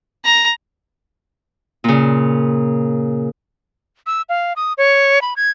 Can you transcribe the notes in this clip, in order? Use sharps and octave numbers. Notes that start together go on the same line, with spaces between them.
A#5
A#2 C#3
E6
F5
D#6
C#5
B5
G#6